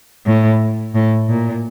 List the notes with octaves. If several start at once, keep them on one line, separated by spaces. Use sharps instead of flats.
A2
A2
A#2